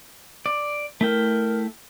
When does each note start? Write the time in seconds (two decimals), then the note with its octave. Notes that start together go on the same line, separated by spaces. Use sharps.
0.46 D5
1.01 A3 E4 A#4 G5